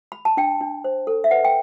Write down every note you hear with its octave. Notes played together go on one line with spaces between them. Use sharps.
B5
A5
D4 G5
D4
C5
A4
E5
B4 F#5
G5